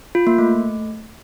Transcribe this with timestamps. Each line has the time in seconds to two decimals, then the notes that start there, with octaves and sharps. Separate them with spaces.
0.15 F4
0.27 A#3
0.38 A3